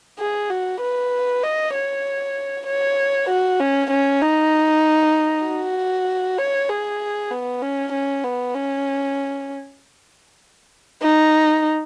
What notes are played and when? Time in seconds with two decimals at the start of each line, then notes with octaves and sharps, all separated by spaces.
0.19 G#4
0.50 F#4
0.81 B4
1.43 D#5
1.74 C#5
2.66 C#5
3.29 F#4
3.60 C#4
3.90 C#4
4.22 D#4
5.45 F#4
6.38 C#5
6.69 G#4
7.31 B3
7.62 C#4
7.92 C#4
8.24 B3
8.54 C#4
11.02 D#4